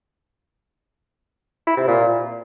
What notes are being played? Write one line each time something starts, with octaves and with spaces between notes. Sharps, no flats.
E4
C3
A#2